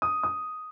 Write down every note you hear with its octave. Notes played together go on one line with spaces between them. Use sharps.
D#6
D#6